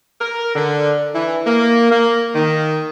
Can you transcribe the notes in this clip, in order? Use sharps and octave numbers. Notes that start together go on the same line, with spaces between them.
A#4
D3
E3
A#3
A#3
D#3